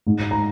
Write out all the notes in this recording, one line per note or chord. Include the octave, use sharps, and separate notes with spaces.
G#2
A#5